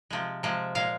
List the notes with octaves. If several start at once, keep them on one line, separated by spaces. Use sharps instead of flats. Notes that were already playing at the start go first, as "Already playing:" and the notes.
C3 F3 G#3
C3 F3 G#3
A#2 G#3 F5